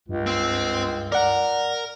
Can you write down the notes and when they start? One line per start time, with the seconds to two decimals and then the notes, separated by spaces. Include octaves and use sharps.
0.09 C#2 G2
0.26 C4
1.12 A#4 D5 F#5